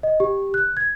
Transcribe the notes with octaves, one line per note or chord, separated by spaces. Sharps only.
D#5
G4
F#6
G#6